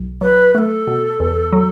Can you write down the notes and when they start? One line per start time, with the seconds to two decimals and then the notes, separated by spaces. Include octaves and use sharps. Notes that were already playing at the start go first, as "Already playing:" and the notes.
Already playing: B1
0.21 F#3 B4
0.54 A3 A4 B4
0.87 B2
1.20 E2
1.52 F#3